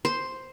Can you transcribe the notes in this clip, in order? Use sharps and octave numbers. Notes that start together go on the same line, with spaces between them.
C5